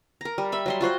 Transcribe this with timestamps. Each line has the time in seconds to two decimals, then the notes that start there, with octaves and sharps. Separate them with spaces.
0.21 A#4 A#5
0.38 G3
0.52 E5 B5
0.66 F#3 G3 C6
0.81 F4 F#4 C5 F#5